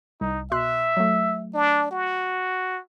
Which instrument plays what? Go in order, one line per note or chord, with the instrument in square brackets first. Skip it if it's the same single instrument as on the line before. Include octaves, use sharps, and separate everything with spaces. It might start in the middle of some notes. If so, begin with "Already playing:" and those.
[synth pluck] C2 [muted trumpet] D#4
[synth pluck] B2 C6 F#6 [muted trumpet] E5
[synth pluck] F#3 A3
[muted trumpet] D4
F#4